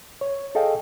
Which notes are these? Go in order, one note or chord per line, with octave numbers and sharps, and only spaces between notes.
C#5
G#4 A4 D#5 F5 G5